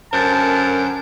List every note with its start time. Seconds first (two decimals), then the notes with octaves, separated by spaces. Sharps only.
0.13 F#2 D3 A#4 C5 A5